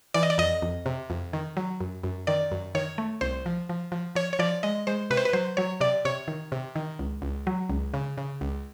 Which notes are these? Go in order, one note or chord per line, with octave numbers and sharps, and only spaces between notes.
E3 D5
D#5
D5
F2 D#5
F2
C3
F2
D#3
F#3
F#2
F#2
D#3 D5
F#2
D#3 C#5
A3
C2 C5
F3
F3
F3
F3 C#5
C#5
F3 D5
G#3 D#5
G#3 C5
C3 B4
C5
B4
F#3 C5
F#3 C#5
C3 D5
C3 C#5
D#3
C3
D#3
C#2
C#2
F#3
C#2
C#3
C#3
C#2